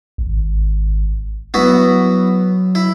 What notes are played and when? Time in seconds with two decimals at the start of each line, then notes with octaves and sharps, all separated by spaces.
0.18 G#1
1.54 F#3 B3 E4 F#4
2.75 E4